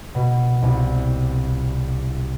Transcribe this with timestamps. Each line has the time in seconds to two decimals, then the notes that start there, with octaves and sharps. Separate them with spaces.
0.15 B2
0.62 C2